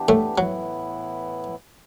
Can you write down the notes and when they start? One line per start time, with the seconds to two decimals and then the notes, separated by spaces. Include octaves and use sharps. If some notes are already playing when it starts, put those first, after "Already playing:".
Already playing: E3 B3 D4 G4
0.08 A2 A3
0.38 A2 E3 F#3 B3 E4